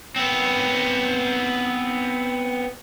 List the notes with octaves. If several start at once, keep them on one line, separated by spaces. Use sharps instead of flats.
B3 C4